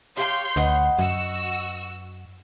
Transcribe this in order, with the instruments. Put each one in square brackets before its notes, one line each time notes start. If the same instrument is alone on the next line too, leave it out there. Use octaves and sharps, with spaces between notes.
[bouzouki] G4 F5 [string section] C#5 C6 G6
[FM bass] D2 [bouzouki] B4 D#5 F#5
[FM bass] F#2 [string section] F#4 E6